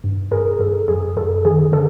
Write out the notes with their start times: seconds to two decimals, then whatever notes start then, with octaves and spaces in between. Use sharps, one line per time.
0.04 G2
0.31 G2 G#4 A#4
0.59 G2 A4
0.88 F#2 G#4
1.17 F#2 A4
1.45 D#3 G#4
1.72 D3 A4